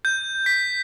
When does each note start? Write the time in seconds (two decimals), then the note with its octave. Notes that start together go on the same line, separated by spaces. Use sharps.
0.05 G6
0.46 B6